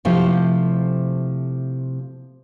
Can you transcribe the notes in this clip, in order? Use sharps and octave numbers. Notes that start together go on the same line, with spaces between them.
C3 F3 A3 E4 A4 F5